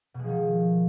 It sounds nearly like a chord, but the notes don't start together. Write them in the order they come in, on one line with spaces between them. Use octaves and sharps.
B2 G#3 F3 D#3